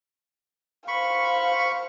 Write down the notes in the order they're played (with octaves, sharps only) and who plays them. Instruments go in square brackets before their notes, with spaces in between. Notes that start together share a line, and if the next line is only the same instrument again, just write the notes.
[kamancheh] C5 F5 [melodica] B5 C#6